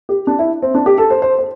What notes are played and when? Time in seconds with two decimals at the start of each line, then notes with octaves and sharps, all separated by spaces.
0.09 G4
0.27 D4
0.39 E4
0.62 C4
0.75 D4
0.86 G4
0.98 A4
1.10 C5
1.22 C5
1.39 C5